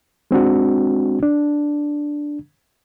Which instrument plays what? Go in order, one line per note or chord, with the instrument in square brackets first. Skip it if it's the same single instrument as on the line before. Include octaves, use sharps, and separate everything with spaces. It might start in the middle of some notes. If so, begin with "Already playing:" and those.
[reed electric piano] G#3 C4 D4 F#4
D4